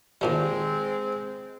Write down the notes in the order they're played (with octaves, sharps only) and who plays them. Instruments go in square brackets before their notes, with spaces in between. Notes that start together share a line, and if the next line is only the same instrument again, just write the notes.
[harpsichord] D#2 A#2 G3 [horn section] G#3 C4